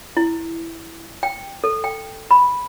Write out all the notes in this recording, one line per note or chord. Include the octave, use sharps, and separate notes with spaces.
E4
G5
A4
G5
B5